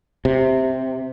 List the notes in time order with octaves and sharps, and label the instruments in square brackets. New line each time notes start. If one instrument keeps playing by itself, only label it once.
[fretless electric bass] C3